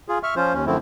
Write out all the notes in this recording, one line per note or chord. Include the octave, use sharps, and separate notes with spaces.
F4 G#4
E5 C#6 F6
F3 C#4 F4 C5
D#2 C#4
F#2 D3 F3 A3 C4 E4